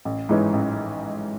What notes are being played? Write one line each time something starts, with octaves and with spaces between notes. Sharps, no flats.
A1
G#2 E3 G#3 C#4
A1